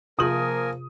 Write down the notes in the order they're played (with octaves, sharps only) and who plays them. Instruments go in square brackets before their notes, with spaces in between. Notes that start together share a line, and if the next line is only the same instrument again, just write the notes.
[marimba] C3 F4 G#4 [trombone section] F3 A#3 [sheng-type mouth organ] A#4 G#5 [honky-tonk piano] D#6